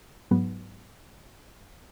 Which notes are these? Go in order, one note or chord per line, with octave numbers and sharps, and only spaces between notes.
G#2 F#3 B3